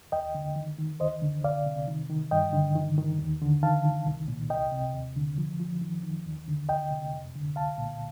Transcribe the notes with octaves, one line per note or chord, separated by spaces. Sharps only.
D#2 D#5 G5
D3
D#3
D#3
D2 C5 D#5
D3
C2 D5 F5
C3
D#3
D#3
G2 D#5 G5
D3
D#3
D#3
D#2
D3
D#3 F5 A5
D#3
C2
A#2
C2 D#5 G5
C3
D#2
D3
F3
F3
D#3
D#3
D#2
D3
D2 D#5 G5
C3
F2
D3
C2 F5 A5
A#2